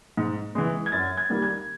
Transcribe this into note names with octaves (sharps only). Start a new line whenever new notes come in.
G#2
E3 G#3
G#6
F#2 A6
G#6
D#3 G3 A#3
G#6